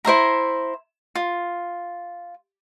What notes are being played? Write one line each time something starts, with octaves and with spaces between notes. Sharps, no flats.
E4 C5 E5 A#5
F4